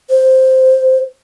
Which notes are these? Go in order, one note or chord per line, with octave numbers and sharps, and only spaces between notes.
C5